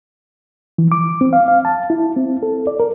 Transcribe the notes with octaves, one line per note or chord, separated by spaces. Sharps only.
E3
D6
C4
F5
F5
A5
E4
C4
A4
D5
A#4